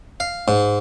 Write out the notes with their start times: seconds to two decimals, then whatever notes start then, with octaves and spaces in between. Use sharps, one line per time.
0.20 F5
0.48 G#2